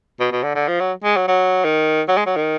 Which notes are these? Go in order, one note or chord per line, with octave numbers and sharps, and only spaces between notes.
B2
B2
D3
D3
F3
F#3
G#3
F#3
F#3
D#3
F#3
G#3
F#3
D#3